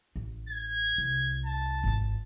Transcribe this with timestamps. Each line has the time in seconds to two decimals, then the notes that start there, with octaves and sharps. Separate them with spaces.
0.16 A1
0.49 G#6
0.98 C2
1.46 A5
1.84 G#1 F4